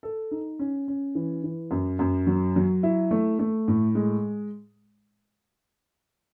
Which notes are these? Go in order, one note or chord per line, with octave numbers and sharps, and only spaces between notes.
A4
D#4
C#4
C#4
E3
E3
F#2
F#2
F#3
F#3
E4
A3
A3
A2
G#3